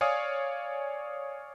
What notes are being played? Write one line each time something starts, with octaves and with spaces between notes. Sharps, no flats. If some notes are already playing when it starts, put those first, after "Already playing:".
C#5 D5 F5 G#5 D#6